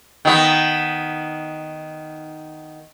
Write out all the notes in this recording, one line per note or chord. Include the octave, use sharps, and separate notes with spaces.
D#3 B3